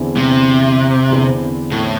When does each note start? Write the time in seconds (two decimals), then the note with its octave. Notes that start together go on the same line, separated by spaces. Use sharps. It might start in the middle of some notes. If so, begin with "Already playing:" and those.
Already playing: E2 D3 C4 E4
0.17 C3
1.10 E2 D3 C4 E4 C5
1.72 A2